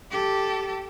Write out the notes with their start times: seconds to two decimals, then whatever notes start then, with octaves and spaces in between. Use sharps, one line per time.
0.11 G4 A4